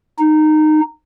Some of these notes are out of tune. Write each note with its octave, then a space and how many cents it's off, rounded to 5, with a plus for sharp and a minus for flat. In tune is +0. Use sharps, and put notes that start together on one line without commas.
D#4 -15